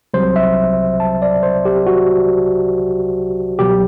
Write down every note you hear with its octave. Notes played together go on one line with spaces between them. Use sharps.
C2 C3 F#3 C5
E5
A5
D5
C5
G4
F#4
C2 B2 F#3 G4